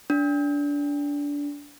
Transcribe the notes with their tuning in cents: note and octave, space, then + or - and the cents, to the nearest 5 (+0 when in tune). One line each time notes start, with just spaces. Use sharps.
D4 -25